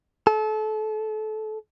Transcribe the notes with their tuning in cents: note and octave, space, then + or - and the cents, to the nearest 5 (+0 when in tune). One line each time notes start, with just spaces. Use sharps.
A4 -30